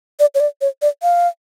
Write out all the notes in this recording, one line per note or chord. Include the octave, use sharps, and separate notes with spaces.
D5
C#5
D5
C#5
D5
F5